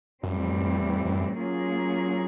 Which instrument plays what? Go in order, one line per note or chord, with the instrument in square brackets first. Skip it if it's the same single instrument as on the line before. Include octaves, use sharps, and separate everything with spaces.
[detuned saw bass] F#2 [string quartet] A2 E3 G3 C4
[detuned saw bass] F2
F#2
F2
E2
F2
F2
F#2
[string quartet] F#3 A#3 C#4 F4 G#4